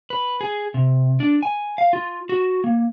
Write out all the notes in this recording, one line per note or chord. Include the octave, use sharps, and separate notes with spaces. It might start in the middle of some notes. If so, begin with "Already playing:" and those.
B4
G#4
C3
D4
G#5
F5
F4
F#4
A#3